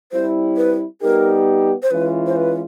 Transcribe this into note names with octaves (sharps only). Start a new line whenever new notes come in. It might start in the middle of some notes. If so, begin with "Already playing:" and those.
G3 C4 E4 C5
B4
G3 B3 D#4 G4 A#4
C5
E3 G#3 C#4 F4 B4
C5
B4